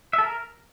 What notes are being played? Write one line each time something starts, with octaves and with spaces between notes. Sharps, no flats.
E5
A4
A#4